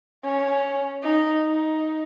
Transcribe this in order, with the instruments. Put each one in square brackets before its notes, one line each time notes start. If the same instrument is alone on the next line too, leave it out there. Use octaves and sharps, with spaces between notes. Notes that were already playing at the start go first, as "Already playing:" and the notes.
[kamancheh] C#4
D#4
D#4